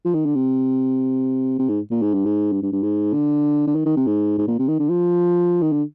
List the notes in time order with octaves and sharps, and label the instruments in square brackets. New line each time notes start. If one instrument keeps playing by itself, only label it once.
[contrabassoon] F3
D#3
D3
C3
C3
G#2
A#2
G#2
G2
G#2
G2
G2
G2
G#2
D3
D3
D#3
D#3
C3
G#2
G#2
A#2
C3
D#3
D3
F3
D#3
D3